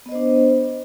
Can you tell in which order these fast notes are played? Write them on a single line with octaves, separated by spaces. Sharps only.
B3 D#5 C5 D4